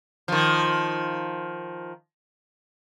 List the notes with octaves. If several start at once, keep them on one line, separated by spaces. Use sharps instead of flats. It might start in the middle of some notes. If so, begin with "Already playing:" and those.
D#3 F3